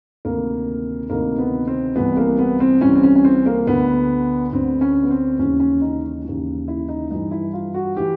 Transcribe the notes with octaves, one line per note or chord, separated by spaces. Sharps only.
D2 C3 D#3 A#3
D2 C3 D#3 A#3
B3
C4
C2 C3 E3 B3
A#3
B3
C4
C2 C3 E3 C#4
C4
C#4
C#4
C4
A#3
D2 D3 B3
D2 D3 C4
C#4
B3
C4
D#2 C#3 E3 C#4
C#4
D#4
D#2 C#3 E3
E4
D#4
G2 E3 D#4
E4
F4
F#4
E3 G4